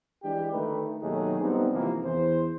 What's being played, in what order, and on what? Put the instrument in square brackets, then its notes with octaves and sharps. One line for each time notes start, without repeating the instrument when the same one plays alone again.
[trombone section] E3 G#3 D4 G4
D2 D#3 A3 D#4 B4
D#2 B2 F#3 A3 D#4 G#4
G3 B3 C4 D4 D#4
D#2 G#2 C3 E3 F3 A#3
E2 E3 C5